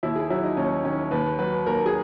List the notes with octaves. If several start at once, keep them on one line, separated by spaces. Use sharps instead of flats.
D#2 E4
G#4
F#3 E4
D#4
D#2 C#4
D#3 C#4
D#2 B4
F#3 B4
D#2 A#4
G#4